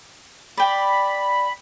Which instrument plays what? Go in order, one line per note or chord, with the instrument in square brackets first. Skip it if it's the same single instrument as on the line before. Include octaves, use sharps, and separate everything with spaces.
[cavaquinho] D5 G5 [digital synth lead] B5